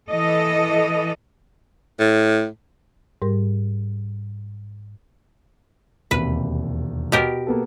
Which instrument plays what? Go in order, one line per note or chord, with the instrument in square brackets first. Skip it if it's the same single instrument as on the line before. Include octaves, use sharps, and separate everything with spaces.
[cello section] E3 A4 D#5
[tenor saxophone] A2
[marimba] G#2 G3 G4 A#4
[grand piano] E1 D#2 C3 [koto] B4
[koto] B2 G4 A#4
[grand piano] A#3 B3 A4